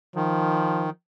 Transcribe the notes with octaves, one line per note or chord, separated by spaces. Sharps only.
D#3 F3